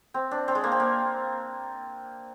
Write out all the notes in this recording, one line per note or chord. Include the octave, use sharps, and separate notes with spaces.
C4
D4
C4
G#3
A#3
C4
A#3